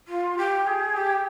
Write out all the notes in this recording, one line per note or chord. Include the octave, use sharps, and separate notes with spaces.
F4
G4
G#4
G4